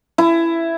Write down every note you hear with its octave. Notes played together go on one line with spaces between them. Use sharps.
E4